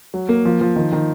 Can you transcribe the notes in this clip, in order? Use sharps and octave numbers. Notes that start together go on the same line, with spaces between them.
F#3
A#3
F3
F3
D#3
D#3